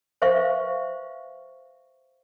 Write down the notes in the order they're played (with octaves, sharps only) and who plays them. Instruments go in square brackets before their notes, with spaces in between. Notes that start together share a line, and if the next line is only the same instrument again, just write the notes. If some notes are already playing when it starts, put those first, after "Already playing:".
[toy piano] B4 C5 E5 F5 C#6